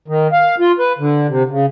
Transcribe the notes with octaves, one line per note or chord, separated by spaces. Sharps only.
D#3
F5
F4
B4
D3
C3
C#3